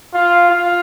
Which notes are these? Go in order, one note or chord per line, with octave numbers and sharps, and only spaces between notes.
F4
F4